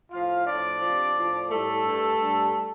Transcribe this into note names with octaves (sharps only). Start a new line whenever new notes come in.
A2 F3 F4 F5
A2 F3 D4 D5
C3 F3
A2 F3
A2 G3 A3 A4
G2 G3
G2 G3